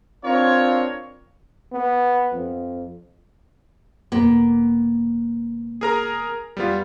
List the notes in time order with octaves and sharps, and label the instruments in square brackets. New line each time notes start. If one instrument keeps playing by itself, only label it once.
[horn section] C4 D4 F4 A#4 C#5
[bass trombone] B3
F2
[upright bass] E1 D#3 [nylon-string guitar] A#3 B3
[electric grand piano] G#4 A#4 A#5
[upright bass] F2 [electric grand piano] G3 B3 F4